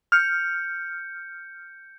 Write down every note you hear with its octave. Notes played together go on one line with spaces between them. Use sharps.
F6 G6 C#7